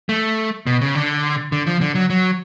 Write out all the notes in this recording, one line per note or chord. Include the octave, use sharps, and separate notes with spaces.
A3
B2
C#3
D3
D3
F3
D3
F#3
F#3